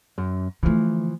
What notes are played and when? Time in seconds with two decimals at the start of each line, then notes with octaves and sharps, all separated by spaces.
0.18 F#2
0.63 D3 E3 F3 A3